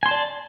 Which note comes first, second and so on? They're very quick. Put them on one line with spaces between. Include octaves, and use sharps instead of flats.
G#5 C6 A5 D5